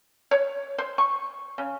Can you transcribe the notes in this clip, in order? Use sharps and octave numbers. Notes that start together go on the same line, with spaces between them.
C#5
C5
C#6
C#3